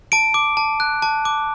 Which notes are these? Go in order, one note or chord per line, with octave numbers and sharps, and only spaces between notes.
A5 D7
D6
A5
F#6
A5
D6